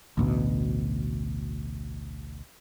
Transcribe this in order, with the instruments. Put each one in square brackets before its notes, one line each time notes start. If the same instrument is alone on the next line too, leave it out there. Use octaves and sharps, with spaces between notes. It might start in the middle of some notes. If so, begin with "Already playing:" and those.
[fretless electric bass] A1 D2 B2